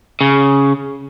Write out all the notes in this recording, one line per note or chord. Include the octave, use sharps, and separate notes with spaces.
C#3